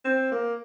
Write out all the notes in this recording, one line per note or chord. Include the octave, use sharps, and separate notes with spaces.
C4
A#3